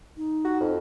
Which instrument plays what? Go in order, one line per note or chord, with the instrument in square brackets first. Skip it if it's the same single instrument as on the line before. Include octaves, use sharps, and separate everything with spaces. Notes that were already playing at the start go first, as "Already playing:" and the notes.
[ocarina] D#4
[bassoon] F#4
F2